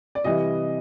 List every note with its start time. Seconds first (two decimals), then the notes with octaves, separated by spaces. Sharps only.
0.15 D5
0.24 C3 E3 G3 D#5